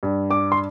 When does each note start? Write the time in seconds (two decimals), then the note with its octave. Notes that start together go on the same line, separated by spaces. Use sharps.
0.03 G2
0.30 D4 D6
0.52 C6